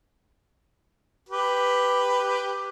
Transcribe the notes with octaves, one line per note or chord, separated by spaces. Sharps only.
G4 B4